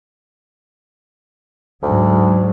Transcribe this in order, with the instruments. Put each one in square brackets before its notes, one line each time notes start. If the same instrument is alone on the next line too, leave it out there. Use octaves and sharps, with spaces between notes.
[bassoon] D2 [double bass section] G#2 F#3 G#3